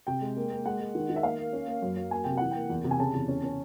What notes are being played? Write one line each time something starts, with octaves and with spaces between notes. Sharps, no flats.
C3 G5
G#3
A#3
A#3
G#3 F#5
G#3
D#3
D#3
E5
A#3 F5
A#3
C#4
A#3
F#2
F#3
A#3 G#5
C3 G5
E3 F#5
A#3 G5
E2
C3
G#5
C#3 A5
E2
C#4
C#4